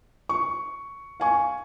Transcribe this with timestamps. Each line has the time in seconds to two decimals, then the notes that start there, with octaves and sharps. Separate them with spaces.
0.29 C#6
1.20 F5 G#5 C#6